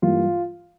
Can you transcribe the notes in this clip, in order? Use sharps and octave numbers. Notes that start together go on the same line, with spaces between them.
G2 E3 G3 A#3 F4